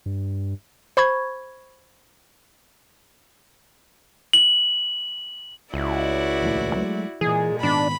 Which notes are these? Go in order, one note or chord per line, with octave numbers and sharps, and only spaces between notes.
G2
C5 B5 C#6 G#6
F#7
C#2 E4 F#4 D5
A#1 D#2 A2
F#3 G#3 A3
A#2 E3 G#3 G#4
G#2 D#3 B3 D4 B5